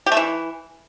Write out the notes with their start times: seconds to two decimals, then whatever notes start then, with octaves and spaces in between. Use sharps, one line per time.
0.06 G4
0.12 A3
0.17 E3